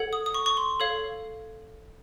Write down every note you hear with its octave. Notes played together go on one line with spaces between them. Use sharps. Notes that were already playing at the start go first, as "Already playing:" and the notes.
Already playing: A4 C#5 F#5
D#6
D#6
C#6
C#6
C6
A4 C#5 F5